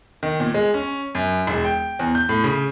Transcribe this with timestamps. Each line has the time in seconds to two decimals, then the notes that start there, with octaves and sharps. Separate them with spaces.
0.23 D#3
0.40 A#2
0.54 G#3
0.74 C#4
1.15 F#2
1.47 E1
1.65 G5
1.99 E2
2.15 G6
2.29 A2
2.44 C#3